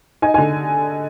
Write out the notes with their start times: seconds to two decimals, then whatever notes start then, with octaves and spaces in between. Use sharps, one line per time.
0.22 D#4 G#5
0.34 D3 G#5